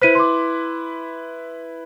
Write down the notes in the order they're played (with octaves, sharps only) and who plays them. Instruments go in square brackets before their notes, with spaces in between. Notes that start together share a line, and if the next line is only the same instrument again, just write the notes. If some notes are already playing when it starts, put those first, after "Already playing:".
[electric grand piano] E4 B4 [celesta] C5 B6 D#7
[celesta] C6 D6